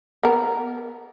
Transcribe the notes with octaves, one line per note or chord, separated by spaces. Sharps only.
B3 A#4